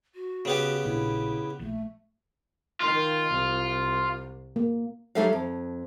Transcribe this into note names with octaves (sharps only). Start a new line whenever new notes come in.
F#4
C#3 B3 G4
A#1 A#2 D4 E4
A#1 A3
D#3 F4
C2
A#3
F#3 G3 D#4 A4 E5 F5
F2